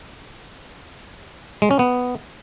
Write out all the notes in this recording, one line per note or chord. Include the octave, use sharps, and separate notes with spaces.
G#3
C#4
B3